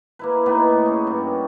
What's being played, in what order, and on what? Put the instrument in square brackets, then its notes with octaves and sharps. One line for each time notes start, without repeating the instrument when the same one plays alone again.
[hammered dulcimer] A#3 E4 B4
A2 A#3 B3 D#4
C#4 G#4
G2